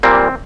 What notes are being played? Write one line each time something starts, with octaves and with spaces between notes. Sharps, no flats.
A#2 G3 A#3 C4